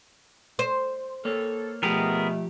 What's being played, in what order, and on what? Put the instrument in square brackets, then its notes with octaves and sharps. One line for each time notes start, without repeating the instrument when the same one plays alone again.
[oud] C5
[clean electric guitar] A#3 C#5 [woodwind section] A4
[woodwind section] B2 A3 [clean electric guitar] F3 G4 [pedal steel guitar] B3 G#4 A#4